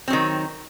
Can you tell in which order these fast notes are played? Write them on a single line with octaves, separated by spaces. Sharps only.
C4 F#3 D#3